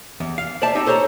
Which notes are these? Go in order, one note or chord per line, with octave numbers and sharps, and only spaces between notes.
E2
F5
C5 D5 E5 A5
C4 D#4 G4
A4 C5 C#5 A5 A#5